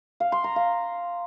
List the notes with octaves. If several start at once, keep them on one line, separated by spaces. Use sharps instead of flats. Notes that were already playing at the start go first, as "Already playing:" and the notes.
F5
C6
A#5
F5